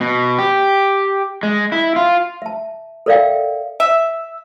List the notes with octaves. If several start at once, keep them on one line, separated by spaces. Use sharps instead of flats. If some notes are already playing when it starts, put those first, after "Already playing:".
B2
G4
G#3
E4
F4
E5 A5
A4 A#4 D5 E5 F5 G5
E5